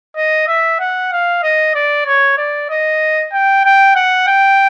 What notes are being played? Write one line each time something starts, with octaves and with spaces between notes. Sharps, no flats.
D#5
E5
F#5
F5
D#5
D5
C#5
D5
D#5
G5
G5
F#5
G5